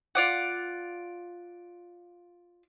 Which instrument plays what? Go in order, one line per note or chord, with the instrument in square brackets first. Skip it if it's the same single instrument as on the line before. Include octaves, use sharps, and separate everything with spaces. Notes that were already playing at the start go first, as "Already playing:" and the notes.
[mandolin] F4 D5 F#5